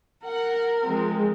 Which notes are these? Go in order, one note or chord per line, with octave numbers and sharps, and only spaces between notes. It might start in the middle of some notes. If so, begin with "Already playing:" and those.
A#4 F#5
F3 G#3 C4